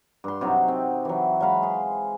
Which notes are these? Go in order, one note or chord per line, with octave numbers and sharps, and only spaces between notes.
G2 C6
C3 F#3 D#4 F#4
C4
E3 F#3
F#3 G#3 F5 B5
G#4 C6